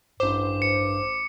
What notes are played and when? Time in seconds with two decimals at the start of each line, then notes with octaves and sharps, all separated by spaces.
0.20 A1 G2 C5 D6
0.62 C#7